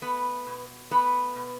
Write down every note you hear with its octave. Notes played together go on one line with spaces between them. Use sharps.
A3 B3 B4
B2
A3 B3 B4
B2